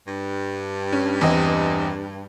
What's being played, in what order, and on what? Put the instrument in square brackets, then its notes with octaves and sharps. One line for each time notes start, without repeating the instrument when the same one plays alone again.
[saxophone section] G2
[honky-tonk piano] C#4
E2 C4 D#5